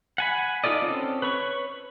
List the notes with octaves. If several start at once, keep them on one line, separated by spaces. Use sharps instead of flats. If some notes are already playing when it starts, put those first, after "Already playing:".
F#5 G#5 B5
D#4 F4 A4 D5 D#5
C4 C#4 A4
B4 C#5 B5 C#6